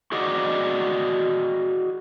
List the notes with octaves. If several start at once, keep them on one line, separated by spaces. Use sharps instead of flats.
F#4 G#4 D5 D#5 F#5